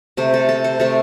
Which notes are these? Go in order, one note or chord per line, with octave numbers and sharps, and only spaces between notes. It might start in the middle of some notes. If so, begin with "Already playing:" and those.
C3 A3 C5
A4
A4
C5
C3 A3 A4